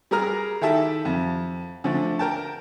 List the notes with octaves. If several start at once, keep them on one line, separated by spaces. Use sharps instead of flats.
G3 G#4 A#4 A#5 F6
D#3 E4 G4 A4 E5 A5
F2
D3 F3 A3
A#4 G5 A5